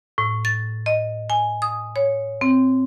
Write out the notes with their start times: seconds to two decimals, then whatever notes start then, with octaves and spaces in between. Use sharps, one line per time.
0.18 A2
0.45 A6
0.86 D#5
1.30 G#5
1.62 D#6
1.96 C#5
2.41 C4